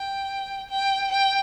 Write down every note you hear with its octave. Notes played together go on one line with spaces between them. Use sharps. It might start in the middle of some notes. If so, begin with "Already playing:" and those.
Already playing: G5
G5
G5